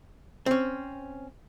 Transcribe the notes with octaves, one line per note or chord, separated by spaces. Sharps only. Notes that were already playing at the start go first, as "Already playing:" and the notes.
C4 C#4